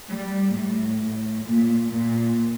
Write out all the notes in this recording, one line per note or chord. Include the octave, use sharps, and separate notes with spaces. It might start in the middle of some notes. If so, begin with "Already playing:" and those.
G3
A2
A#2
A#2